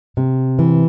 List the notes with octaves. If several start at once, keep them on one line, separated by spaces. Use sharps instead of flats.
C3
E3